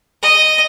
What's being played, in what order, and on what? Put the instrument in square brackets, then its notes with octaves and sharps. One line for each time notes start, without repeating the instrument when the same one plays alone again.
[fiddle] D#5